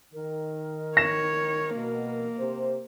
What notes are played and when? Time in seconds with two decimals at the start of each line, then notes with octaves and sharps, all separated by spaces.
0.13 D#3 A#4
0.97 C#5 A#6 E7
1.75 B2 A#3
2.38 C3 C5